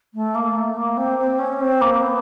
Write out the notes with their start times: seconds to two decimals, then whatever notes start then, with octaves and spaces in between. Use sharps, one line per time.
0.14 A3
0.35 A#3
0.55 A3
0.76 A#3
0.97 C4
1.18 C4
1.38 C#4
1.60 C4
1.81 A#3
2.02 B3